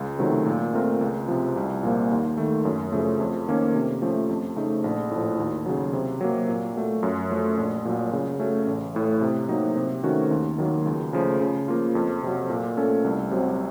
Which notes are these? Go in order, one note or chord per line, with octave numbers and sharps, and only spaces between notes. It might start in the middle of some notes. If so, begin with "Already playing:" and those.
Already playing: C#2
C3 D#3 F#3 A3
A#2
A3 C4 F4 A#4
C#2
C3 F3
C2
A#2 F3 A#3
D#2
D#3 A3
F#2
C#3 F3 A3
F2
D#3 A#3 C#4
C3
F3 A3 C#4
F2
C#3 A3 D#4
A#1
A2 F3
D#2
C#3 F#3
C3
F#3 A#3
A#2
F#3 A3
F#2
F3 A3
A#1
A#2 F#3
C#3
A3 C#4 F#4
A1
A2 A3
C3
F#3 A#3 D#4
C3
D#3 A3 C#4 F#4
D#2
D#3 F#3 A#3
C#2
C#3 F3 A3
C#3
F3 A#3 F4
F2
C3 F#3
A#2
A3 C#4 A4
C2
C3 F#3 C4